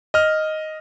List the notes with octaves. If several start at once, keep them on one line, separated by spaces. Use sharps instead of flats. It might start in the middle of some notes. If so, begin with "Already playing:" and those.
D#5 F6